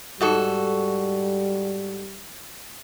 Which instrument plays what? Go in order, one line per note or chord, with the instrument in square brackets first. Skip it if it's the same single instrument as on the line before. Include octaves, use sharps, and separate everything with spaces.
[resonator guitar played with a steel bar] G#2 F#4 A4 [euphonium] G3